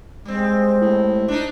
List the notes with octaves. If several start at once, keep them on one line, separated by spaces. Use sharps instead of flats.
G3 G#3 C4
A2
D4 D#4